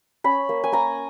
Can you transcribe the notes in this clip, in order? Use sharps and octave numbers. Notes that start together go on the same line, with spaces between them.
C#4 B5
A#3
G#5
A#3 A#5